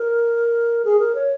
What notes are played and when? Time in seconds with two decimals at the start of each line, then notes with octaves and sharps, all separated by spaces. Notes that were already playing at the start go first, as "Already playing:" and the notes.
Already playing: A#4
0.85 G#4
0.99 A#4
1.15 C#5